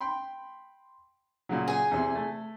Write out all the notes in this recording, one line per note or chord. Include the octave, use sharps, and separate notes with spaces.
G5 B5 C6
A#2 C#3 F#3
G#4 G#5
E2 C3
A3